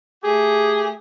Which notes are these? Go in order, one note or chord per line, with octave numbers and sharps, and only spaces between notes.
A3 G4 G#4